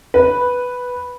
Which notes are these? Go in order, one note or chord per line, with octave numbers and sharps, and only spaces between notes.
B4